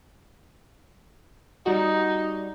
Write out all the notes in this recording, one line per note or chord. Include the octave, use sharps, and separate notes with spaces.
G3 D#4 F#4